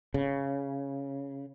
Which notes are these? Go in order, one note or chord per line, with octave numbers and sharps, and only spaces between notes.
C#3